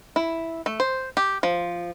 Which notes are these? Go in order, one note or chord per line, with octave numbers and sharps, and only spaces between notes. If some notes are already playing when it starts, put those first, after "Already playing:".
E4
A3
C5
G4
F3